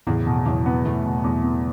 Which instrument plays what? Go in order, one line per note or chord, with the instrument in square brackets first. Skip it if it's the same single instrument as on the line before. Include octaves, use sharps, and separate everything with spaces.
[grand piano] E2 [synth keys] A2 C#3
[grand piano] B2
[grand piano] E2 [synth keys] C#3 F#3
[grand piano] B3
[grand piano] E2 [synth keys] E3 A3
[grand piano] B2
E2
B3